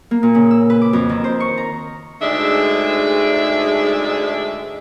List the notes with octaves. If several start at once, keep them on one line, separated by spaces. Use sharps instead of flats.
A#3
A#2
C#3
E6
B4
D6
F2
D#3
C5
C#6
A#5
D2 G#2 G#3 D4 E5